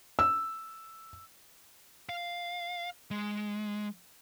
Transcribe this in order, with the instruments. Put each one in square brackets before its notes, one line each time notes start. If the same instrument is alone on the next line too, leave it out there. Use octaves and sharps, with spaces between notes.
[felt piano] E6
[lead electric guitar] F5
G#3